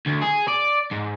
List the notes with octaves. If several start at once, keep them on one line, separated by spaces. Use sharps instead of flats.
D2
G#4
D5
G#2